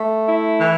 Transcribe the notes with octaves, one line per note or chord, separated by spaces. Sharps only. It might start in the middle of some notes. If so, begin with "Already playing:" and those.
Already playing: A3
E4
E3